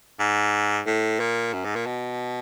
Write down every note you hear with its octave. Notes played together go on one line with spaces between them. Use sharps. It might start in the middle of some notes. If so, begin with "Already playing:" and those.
G#2
A2
A#2
F#2
G#2
A#2
B2